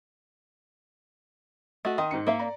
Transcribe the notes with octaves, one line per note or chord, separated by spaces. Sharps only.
A3 F#4 D#5
D#3 D#5 C6 D#6
G#2 D#4 C#7
A#3 E5 F5
D5 A#5